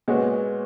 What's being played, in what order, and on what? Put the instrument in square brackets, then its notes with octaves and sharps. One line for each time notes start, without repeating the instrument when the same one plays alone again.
[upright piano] A#2 G#3 B3 F#4 C#5